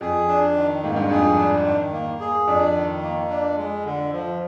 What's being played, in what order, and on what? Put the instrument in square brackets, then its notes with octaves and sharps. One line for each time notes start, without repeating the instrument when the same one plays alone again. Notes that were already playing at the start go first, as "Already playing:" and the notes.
[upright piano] F2 [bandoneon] G#4
[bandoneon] D4
D#3
[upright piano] G#2 [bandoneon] A#3
[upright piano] G2
[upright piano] F2 [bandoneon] G#4
[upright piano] G2
[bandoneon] D4
D#3
A#3
G#4
[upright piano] F2 [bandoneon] D4
[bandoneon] D#3
A#3
D4
G#3
D3
F3